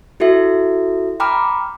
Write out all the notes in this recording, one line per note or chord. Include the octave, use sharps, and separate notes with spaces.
E4 F#4 A4 E5
G5 A#5 B5 D6 F6